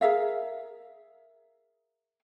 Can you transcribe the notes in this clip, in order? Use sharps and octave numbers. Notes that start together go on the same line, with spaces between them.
G#4 A#4 E5 F5